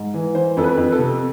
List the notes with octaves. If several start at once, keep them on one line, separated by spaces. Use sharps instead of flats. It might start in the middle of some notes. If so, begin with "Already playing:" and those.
Already playing: G#2
E3
E3 C5
F2 A4
B4
F2
A4
C3